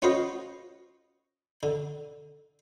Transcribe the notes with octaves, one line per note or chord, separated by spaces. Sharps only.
C#4 F4 F#4 B4 C5 D#5
D3